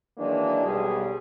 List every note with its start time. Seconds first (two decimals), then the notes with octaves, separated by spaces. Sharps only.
0.18 D#3 E3 F#3 G#3 A#3 D4
0.64 B1 G3 G#4